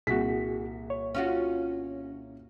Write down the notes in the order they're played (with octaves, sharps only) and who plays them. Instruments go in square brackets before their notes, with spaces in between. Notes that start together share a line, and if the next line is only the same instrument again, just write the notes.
[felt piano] C2 A#2 B6 [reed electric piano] F#4 G#4
[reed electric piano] C#5
[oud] C#4 F4 F#4